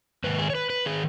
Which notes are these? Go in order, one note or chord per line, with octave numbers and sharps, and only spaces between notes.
G#2 D#3 B4
G#4
C#5
B4
B4
D#3 G#4